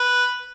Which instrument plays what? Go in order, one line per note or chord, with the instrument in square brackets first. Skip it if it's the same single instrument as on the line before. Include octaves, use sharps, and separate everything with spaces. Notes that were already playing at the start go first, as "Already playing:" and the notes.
Already playing: [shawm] B4